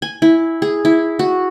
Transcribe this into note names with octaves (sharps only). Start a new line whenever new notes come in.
G#5
E4
G#4
E4
F#4